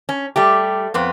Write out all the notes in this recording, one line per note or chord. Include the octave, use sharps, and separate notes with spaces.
C#4
G3 A3 G4
F2 B3 C4